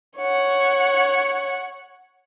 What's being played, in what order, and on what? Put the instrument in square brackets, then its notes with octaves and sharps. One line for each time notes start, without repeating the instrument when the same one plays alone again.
[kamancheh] C#5 F#5